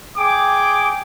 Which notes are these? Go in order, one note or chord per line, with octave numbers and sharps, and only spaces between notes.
G#4 G5 D6